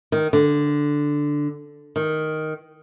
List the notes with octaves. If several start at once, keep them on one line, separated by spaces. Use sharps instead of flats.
D#3
D3
D#3